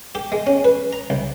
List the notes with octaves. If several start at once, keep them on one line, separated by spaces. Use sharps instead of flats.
G4
G#3
C#4
B4
A#5
C2